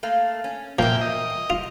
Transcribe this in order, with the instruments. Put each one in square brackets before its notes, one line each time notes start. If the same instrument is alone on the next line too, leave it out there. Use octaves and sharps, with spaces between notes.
[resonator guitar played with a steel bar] A3 A#3 F5
C#4
[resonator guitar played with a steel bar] E2 A#4 E5 [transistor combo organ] A#2 G5 [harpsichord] F3
[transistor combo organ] D#5
[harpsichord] F4